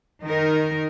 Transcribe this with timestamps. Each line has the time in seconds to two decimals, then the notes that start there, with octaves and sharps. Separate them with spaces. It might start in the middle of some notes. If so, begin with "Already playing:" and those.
0.23 D#3 D#4 A#4